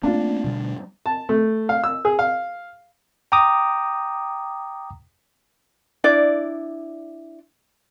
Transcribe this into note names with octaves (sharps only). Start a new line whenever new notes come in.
A3 A#3 C4 D4 F4
B2 D3 G3
A5
A3
F5
E6
G#4
F5
G5 A#5 D6 D#6
D4 E4 D5